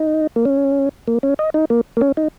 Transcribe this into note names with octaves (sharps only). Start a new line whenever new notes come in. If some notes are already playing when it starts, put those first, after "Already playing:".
Already playing: D#4
A#3
C#4
A#3
C#4
D#5
D#4
A#3
A#3
C#4
D#4